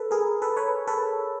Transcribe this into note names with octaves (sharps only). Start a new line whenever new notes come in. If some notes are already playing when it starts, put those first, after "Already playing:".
Already playing: A4 B4
G#4 A#4
A4 B4
B4 C#5
A4 B4